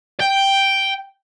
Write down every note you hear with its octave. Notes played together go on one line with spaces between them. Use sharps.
G5